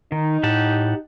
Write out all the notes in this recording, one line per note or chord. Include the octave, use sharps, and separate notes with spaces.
D#3 D#4
A2 G4 F#5 A5